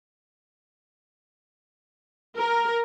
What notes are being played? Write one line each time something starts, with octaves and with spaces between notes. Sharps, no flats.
A#4